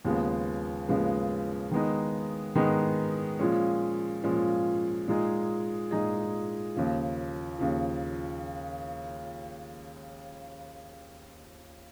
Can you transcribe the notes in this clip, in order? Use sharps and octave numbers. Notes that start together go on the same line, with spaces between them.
D#2 C#3 F3 G#3 B3
D#2 C#3 F3 G#3 B3
D#3 G#3 B3 D#4
D#3 G#3 B3 D#4
A#2 F3 G#3 C#4
A#2 F3 G#3 C#4
A#2 G#3 D#4 G#4
A#2 G#3 D#4 G#4
D#2 C#3 F3
D#2 C#3 F3